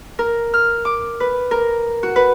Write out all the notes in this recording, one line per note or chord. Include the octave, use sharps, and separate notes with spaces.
A#4
F6
D6
B4
A#4
F#4
B4